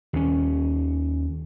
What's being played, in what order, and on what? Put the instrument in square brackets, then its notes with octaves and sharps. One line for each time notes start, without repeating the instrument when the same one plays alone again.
[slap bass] D#2 C#4